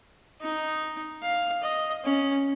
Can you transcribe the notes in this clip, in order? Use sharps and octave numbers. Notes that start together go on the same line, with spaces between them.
D#4
F5
D#5
C#4